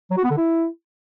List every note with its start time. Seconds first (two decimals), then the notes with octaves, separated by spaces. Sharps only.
0.11 F#3
0.17 F#4
0.24 B3
0.31 D3
0.37 E4